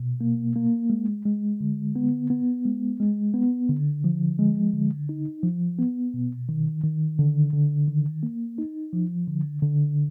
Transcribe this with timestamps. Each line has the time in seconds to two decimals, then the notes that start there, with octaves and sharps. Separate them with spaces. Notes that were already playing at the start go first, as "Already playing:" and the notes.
Already playing: B2
0.21 A#3
0.56 A#3
0.90 G#3
1.25 G#3
1.61 D3
1.96 B3
2.30 B3
2.65 G#3
3.00 G#3
3.34 B3
3.69 D3
4.04 F3
4.39 G#3
4.73 D3
5.09 D#4
5.43 F3
5.79 B3
6.14 B2
6.49 D#3
6.84 D#3
7.19 D3
7.53 D3
7.88 D#3
8.23 A#3
8.58 D#4
8.93 F3
9.27 D3
9.62 D3